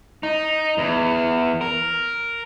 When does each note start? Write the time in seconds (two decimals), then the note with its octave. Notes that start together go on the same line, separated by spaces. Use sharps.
0.23 D#4
0.78 E2
1.61 A#4